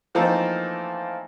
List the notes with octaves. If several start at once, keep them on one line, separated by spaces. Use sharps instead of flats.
E3 F3 A3 A#3 C4 D#4